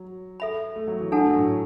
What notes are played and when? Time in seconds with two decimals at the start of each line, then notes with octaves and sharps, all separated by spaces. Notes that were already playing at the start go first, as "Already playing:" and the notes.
Already playing: F#3
0.40 A4 E5 B5
0.76 A3
0.88 F#3
1.00 E3
1.11 F#3 D4 A4 F#5 A5
1.20 A3
1.30 F#3
1.38 A2